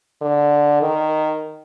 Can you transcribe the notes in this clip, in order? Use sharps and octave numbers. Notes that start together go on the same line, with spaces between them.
D3
D#3